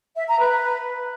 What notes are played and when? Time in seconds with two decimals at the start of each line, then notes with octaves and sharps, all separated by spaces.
0.16 E5
0.27 A#5
0.39 B4